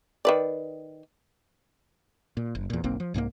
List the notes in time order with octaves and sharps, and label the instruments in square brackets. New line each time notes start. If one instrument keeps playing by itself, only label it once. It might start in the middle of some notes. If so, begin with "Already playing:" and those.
[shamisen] D#3 B4 D5
[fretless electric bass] A#2
F#1
E2 A#2
F#1 B1 A#3 C4
F3
C2 G#2 G#3 A#3